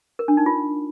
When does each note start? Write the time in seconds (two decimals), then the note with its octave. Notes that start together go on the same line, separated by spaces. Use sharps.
0.19 A#4
0.28 D4
0.37 D#4
0.46 F4